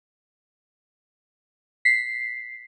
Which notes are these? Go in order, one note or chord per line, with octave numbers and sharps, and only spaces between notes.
B6 C7